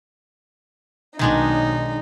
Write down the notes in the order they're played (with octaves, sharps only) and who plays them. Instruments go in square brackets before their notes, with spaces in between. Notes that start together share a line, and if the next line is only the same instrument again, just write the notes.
[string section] B1 [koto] D#3 G#3 D4 [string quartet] D#4